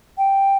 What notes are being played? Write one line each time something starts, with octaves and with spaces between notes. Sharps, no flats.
G5